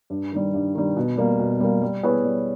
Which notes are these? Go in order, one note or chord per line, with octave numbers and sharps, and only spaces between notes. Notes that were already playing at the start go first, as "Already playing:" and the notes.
G2
D#3 G3
G2
D#3 G3
B2
G3 A#3
B2
G3 A#3
G3
B3 E4 G#4 C#5
G3